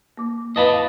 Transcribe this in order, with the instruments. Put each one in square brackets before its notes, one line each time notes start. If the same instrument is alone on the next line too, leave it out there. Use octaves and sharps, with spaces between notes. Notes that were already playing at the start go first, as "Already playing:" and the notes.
[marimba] A#3 D6
[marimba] F2 B4 F5 [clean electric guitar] D#5 A5 B5